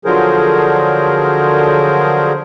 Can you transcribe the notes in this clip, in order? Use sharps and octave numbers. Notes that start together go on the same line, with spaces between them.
D3 F3 F#3 G#4 A#4 C5